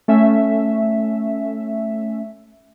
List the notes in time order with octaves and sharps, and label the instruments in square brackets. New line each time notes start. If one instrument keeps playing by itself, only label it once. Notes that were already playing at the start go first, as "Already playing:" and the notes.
[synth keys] A3 C#4 E5